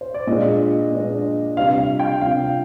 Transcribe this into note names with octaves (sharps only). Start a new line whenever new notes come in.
C5
D5
A#2 G#3 D4 F4 D#5
A#2 G#3 D4 F4
C3 G3 D4 F4 F5
F5
G5
C3 G3 D4 F4 F5